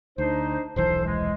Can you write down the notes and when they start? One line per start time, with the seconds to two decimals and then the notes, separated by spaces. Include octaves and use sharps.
0.18 D2 D4 D#4 C5
0.76 D#1 B1 E3 A4 C5
1.05 G#3